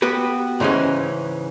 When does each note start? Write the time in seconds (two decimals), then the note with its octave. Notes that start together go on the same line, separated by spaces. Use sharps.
0.02 B3 F#4 G4 B4
0.60 G#2 C#3 E3 G#3 C#4